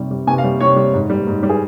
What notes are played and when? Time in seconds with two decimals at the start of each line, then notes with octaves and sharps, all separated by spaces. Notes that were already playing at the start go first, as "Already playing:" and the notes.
Already playing: C3 G3
0.11 G3
0.27 C3 G#5
0.38 F5
0.44 G3
0.60 C3 C#5
0.76 G3
0.93 G#2
1.10 G3
1.27 G#2
1.43 G3
1.49 G#4